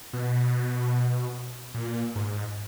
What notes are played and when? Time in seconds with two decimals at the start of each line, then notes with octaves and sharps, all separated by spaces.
0.13 B2
1.74 A#2
2.16 G#2